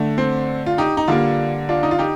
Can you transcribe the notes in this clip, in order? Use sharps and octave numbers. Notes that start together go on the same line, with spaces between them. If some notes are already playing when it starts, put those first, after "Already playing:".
Already playing: D3 A3
C4
F4
D#4 G4
D#4
D3 G3 A#3 D4 F4
D4 F4
D#4
F4
D#4 G4